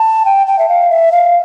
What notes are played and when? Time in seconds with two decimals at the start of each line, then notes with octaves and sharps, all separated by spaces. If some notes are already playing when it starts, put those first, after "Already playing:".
Already playing: A5
0.25 G5
0.47 G5
0.59 E5
0.69 F5
0.90 E5
1.12 F5